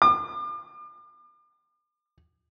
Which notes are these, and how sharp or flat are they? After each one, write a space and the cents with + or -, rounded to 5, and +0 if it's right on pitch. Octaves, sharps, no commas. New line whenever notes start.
D6 +40